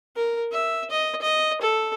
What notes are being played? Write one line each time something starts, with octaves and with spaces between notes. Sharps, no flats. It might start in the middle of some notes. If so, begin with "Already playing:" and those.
A#4
E5
D#5
D#5
A4